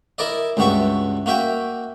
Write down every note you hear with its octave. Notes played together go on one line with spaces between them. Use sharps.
E4 A#4 D5 D#5
C#2 G2 G3 F#4 E5 C#6
A#3 F#4 E5 G5